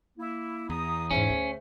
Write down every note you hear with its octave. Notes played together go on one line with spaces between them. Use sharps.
A#3 E4
E2 A#5 D#6
G#2 C#4 E4 G#4 C5 E5
D2